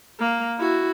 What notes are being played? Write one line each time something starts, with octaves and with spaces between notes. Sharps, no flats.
A#3
E4 F#4